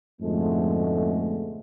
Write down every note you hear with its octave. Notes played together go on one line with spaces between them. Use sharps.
F2 G#2 B2 D3 G#3 A3